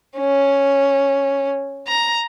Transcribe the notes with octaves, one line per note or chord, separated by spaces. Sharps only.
C#4
A#5